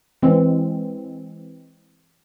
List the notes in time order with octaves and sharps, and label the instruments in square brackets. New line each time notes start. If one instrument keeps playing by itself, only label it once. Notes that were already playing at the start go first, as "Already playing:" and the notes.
[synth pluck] E3 G#3 C4